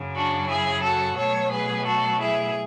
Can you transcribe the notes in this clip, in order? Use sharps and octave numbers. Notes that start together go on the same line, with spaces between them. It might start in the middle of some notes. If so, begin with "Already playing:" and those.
Already playing: F#2 C#3 F#3
D4 F#4
E4 G#4
F#4 A4
B2 F#3 A3 A4 C#5
G#4 B4
F#4 A4
E4 G#4